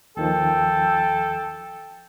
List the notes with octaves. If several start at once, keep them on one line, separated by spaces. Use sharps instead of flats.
D#2 D#3 F3 A4 G5